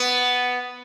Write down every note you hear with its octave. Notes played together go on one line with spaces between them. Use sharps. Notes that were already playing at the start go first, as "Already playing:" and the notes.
Already playing: B3